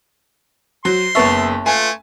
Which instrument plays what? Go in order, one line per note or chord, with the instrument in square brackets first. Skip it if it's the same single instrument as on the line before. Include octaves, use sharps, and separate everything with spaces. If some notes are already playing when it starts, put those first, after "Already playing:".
[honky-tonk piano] F#3 [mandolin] C5 [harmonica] C6
[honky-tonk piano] F#1 B3 E5 [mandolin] C#5 A5
[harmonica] A3 [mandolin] F4 B4 C6 [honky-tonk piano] G#5